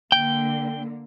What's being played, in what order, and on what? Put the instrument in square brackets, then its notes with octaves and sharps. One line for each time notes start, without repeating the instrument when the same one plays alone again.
[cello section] D3 A#3 [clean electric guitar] G5